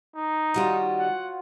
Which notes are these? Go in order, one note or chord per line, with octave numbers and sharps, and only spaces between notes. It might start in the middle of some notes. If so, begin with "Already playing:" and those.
D#4
D#3 G3 F4 F#4 C#5 D#5
F#5